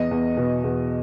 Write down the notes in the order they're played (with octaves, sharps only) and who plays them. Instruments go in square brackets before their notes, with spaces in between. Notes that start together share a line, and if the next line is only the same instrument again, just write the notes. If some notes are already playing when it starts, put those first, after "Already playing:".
Already playing: [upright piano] E2 D#5
E2
B2
E2